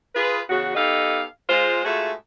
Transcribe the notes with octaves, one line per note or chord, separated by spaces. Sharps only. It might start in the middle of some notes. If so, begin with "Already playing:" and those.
F4 G#4 B4
E2 C#3 F#4
B3 D#4 G4 A4 D#5 F5
G#3 F4 C5
G#2 A3 F4 F#4 G#4 E5